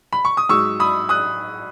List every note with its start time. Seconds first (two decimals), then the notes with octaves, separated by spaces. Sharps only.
0.13 B5
0.25 C#6
0.37 D#6
0.49 G#2 F#3 C#6 E6
0.80 B5 D#6
1.09 D#6 F#6